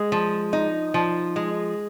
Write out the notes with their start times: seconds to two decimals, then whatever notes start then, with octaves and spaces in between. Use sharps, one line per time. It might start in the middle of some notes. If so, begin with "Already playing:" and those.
Already playing: G#3
0.12 F3
0.53 D#4
0.94 F3
1.36 G#3